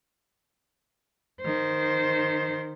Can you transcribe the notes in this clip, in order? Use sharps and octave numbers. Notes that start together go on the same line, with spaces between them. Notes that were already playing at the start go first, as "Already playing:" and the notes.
D#3 C5